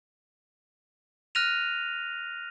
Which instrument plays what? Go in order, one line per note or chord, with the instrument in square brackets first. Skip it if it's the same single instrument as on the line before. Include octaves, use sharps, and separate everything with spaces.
[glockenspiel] F6 F#6 A#6 D#7 F7